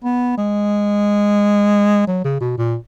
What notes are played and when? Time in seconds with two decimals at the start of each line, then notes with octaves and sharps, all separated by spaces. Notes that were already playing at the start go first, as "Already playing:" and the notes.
0.04 B3
0.38 G#3
2.07 F#3
2.24 C#3
2.41 B2
2.58 A#2